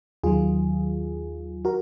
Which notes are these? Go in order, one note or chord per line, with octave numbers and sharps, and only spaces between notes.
D#2 D#3 F#3 F4 G#4
F#4 A#4